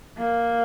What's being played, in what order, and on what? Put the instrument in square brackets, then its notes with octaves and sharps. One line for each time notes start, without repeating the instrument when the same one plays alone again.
[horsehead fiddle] A#3